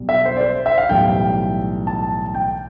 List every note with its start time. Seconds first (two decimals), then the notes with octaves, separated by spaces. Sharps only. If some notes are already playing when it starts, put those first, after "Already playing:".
Already playing: B1 B2 G3
0.09 E5
0.25 C5
0.37 D5
0.41 C5
0.66 E5
0.78 F5
0.89 B1 A2 E3 G3 G5
1.87 A5
2.35 G5